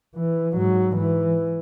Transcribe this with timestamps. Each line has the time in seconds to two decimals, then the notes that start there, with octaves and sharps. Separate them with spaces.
0.16 E3
0.54 G#2 F#3
0.97 E3